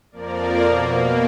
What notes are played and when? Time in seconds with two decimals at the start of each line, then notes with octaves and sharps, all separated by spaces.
0.12 F2 F3 A#3 A#4 D5
0.64 B2 A#3